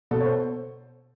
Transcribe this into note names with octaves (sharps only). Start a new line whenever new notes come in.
B2 A4
C#5
C5